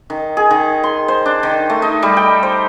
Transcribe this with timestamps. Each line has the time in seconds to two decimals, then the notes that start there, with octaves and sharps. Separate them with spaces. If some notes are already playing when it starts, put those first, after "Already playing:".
0.10 D#3
0.37 G#4
0.51 D#3
0.84 C6
1.08 C5
1.26 D4
1.43 D#3
1.70 A3
1.82 D#4
2.02 G3
2.17 G5
2.43 C5